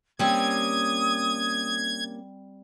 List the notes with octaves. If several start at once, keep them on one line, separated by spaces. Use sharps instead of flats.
G3 A#3 C4 C#4 G4 D#6 G#6